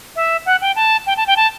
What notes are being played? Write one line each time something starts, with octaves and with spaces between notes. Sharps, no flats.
E5
F#5
G5
A5
G5
A5
G5
A5